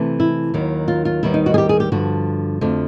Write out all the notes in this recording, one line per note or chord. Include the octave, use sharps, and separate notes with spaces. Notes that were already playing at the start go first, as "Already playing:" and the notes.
Already playing: C3 E3 A3
E4
D#2 D#3 F#3
F4
F4
D#2 D#3 G3 B3 E4
D#4
F#4
G#4
G4
G#4
G4
G2 D3 F3 F#4
F2 D3 F3 A3